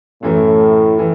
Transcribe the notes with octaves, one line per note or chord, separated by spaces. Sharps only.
F#2 A2 E3 A3
E3